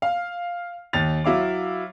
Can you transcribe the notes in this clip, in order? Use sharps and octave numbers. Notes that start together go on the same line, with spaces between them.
F5
D#2 A6 F7
F#3 E4 F5 D6